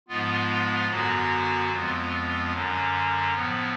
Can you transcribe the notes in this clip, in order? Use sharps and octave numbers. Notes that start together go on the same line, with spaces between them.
G#2 F3 G#3 B3 F4
F#2 D3 F#3 B3 F#4
F2 F3 G#3 B3 F4
F#2 D3 F#3 C#4
A2 F3 B3